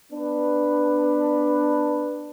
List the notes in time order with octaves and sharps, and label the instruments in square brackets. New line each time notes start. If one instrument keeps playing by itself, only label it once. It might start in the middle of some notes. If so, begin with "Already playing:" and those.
[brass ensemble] B3 D4 B4